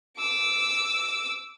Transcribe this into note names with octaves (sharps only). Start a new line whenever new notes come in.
D6 E6